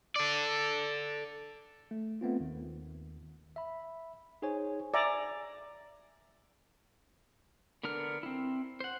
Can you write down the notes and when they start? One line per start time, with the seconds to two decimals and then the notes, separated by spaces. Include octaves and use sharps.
0.16 A4 D5
1.91 A3
2.21 A3 B3 C4 F4
2.40 D#2 D#3
3.56 E5 B5
4.42 D#4 G#4 C5 C#5 G#5
4.94 D5 E5 G#5 A#5
7.83 D3 B3 D4 A#4 F6
8.23 C4 E4
8.80 C5 F#5